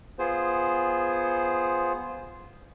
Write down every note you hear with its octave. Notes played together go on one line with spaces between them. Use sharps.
B3 F4 G#4 C5